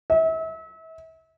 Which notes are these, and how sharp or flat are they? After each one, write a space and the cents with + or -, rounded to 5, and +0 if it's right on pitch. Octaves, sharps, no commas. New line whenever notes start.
E5 -35